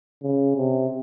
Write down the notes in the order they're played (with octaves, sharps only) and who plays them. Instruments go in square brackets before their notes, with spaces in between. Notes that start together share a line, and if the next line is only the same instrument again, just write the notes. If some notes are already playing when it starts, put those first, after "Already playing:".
[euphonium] C#3
C3